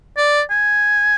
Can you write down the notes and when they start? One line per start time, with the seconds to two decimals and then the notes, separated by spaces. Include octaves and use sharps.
0.17 D5
0.50 G#5